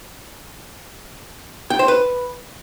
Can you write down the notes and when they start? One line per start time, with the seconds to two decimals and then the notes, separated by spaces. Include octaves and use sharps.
1.70 G5
1.79 C5
1.88 B4